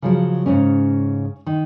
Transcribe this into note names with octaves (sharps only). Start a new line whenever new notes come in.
C#3 F3 F#3
G#2 C#3 C#4
D#3